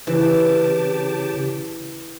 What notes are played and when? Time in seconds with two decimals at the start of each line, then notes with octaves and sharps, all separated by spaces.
0.07 C#3 E3 G4 A5